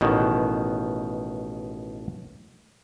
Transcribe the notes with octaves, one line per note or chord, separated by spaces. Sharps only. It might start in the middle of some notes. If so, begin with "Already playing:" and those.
A1 B2 D#3